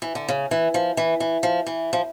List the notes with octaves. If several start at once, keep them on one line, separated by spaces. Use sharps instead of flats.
E3
D3
C#3
E3
F3
E3
E3
F3
E3
F3